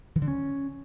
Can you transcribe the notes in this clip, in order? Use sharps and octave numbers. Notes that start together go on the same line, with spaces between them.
E3
D3
C#4